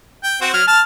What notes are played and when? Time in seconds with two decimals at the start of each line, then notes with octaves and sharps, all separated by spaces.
0.24 G5
0.41 C4 F#4 C5
0.54 F#3 F6
0.68 A5 F6